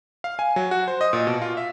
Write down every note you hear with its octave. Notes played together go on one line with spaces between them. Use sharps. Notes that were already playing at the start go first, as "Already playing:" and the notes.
F5
G#5
F#3
F#4
C5
D#5
A#2
B2
F4
E5